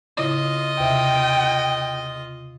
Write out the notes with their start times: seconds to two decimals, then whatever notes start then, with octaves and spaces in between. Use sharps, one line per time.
0.17 A2 C#3 E4 F4 D#5
0.79 D#2 C3 E5 G5